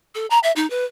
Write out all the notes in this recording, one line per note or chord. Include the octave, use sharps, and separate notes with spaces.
A4
A#5
E5
D#4
B4